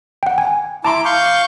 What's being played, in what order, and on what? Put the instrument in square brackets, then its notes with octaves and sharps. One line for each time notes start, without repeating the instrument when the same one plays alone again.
[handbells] F#5 G5
G#5
[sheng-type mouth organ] E4 D6 [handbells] A5 A#5 C6
[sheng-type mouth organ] F5 C#6 G6